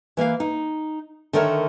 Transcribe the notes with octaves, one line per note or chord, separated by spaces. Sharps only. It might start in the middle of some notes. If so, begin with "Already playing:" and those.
E3 A#3 B4 F5
D#4
D3 D#3 A3 A#4 C#5 E5